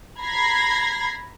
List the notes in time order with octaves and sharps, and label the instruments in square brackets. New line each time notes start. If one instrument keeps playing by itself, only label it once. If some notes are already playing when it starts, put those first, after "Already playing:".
[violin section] A#5 B5 G#6 A#6 C7